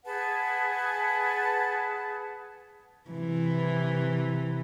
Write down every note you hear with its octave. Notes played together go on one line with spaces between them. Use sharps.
G#4 B4 F#5 A5
C3 E3